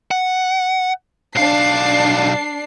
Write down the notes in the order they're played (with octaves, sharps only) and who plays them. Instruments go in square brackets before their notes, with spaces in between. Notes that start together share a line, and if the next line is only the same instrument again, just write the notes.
[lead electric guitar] F#5
[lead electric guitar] B1 F5 [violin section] D4 C7